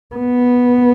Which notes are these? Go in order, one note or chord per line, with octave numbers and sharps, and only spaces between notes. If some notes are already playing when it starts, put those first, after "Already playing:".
B3